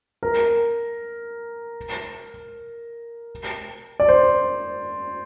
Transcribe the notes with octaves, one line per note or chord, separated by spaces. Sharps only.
A#4
D5
C5